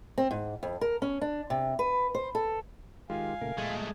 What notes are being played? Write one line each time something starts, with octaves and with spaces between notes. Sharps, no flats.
C4
G#2
F2
A#4
C#4
D4
C3
B4
C5
A4
D#3 G#3 F4 G4 F5 G#5
A#2 C#3 A3 A#4
A#2 G#3 A3 G#6